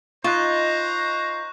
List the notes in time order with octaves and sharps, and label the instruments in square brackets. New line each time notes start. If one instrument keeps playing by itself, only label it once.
[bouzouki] D#4 [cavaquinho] F4 [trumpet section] C5 A#5 [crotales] C#6 F#6